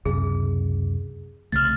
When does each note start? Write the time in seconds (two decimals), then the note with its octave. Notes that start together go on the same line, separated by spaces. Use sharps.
0.05 C#2 F#2 C3 G#4
1.52 C2 C#3 A3 F6 A6